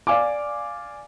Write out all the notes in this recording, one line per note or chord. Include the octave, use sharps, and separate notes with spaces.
D5 F5 G#5 D6